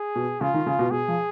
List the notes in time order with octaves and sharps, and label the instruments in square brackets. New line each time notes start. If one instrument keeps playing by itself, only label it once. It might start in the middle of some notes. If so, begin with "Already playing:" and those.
Already playing: [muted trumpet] G#4
[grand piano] B2
[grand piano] C#3 [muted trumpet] F4
[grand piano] D#3
C#3
B2
[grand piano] B2 [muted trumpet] G#4
[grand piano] F3